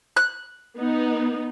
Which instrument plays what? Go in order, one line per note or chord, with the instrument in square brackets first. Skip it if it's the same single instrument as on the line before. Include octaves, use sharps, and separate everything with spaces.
[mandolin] F#6
[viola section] B3 D#4